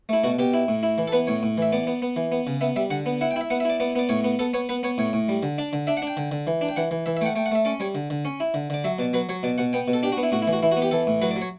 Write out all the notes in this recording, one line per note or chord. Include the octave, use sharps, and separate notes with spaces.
A3 E4
B2 F#4
B2 G4
E4
A2
E4
E3
A4
B3 B4
A2 C#5
A2
E3 E5
B3 D5
B3
B3
E3
B3
C#3
B3 E5
G3 E5
D3 F#5
B3
E4 F#5
G5
E4 E5
B3 F#5
E5
E4 D5
B3 D5
B3 D5
A2 C#5
B3
B3 A4
B3 C#5
B3 B4
B3 C#5
A2 C#5
A2
G3
D3
D4 D5
D3
D4 E5
F#5
D4
G5
D3
D3
E3
D4
G5
E3 F#5
E3
E3 E5
E5
A3 F#5 G5
A3 G5
F#5
A3 E5
C#4 D5
G3 C#5
D3
D3
C#4
E4
D3
D3 D5
F#3 E5
B2 D5
F#3 B4
F#3 C#5
B2 D5
B2 F#5
B3 G5
B2
A4
D4 G4
F#4
B3
E4
A2 F#4
E4
E3
F#4
E3 E4
F#4
B3
G4
E3 A4
A2
F#3 B4
D5
F#3
C#5